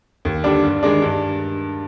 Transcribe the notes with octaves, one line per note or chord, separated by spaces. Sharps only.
D#2
D3 G3 D4
G2
D#3 G#3 D4
G2